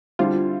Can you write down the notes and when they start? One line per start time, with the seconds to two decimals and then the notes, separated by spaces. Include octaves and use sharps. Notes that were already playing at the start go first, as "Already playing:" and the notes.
0.19 D3 G3 C4 E4 F4